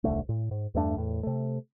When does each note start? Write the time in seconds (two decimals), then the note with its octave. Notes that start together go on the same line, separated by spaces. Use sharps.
0.04 D#1 C2 D3 A3
0.29 A2
0.51 G#2
0.75 E2 G2 A3 D4
0.96 E2 A2
1.23 C3 A3